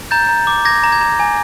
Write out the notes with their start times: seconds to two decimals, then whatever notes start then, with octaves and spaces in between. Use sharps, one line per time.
0.11 A#5 G6 A6
0.29 A#5
0.47 D6
0.65 D6 G#6 A#6
0.84 A#5
0.92 G#6
1.01 A#5
1.20 G#5